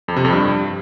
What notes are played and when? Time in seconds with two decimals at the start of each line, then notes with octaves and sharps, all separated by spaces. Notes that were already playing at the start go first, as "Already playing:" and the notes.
0.08 F2
0.16 C3
0.25 F2
0.33 G2